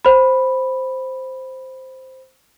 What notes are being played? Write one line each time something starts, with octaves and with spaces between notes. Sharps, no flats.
C5 B5